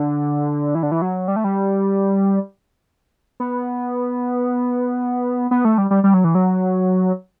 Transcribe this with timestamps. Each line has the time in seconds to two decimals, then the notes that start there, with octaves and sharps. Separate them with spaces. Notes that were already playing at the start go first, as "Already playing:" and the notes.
Already playing: D3
0.75 E3
0.83 D3
0.92 E3
1.02 F#3
1.28 G3
1.36 A3
1.44 G3
3.40 B3
5.51 B3
5.65 A3
5.78 G3
5.91 G3
6.04 G3
6.14 F#3
6.24 E3
6.35 F#3